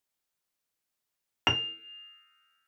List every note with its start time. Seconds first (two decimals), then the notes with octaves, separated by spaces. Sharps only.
1.47 F7